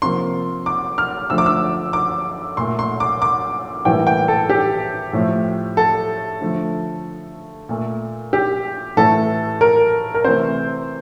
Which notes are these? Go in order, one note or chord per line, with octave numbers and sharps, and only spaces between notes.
C3 F3 A#3 C6
D6
F6
D3 F3 A3 E6
D6
E6
D6
A#2 A3 C6
C6
D6
D6
A2 E3 G3 A#3 G5
G5
A4
G4
A2 F3 A3
A4
D3 F3 A3
A#2 A3
G4
A2 E3 A3 A4
A#4
A#4
C3 E3 A3 C5